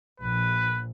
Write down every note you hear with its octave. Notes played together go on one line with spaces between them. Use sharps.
A#1 B4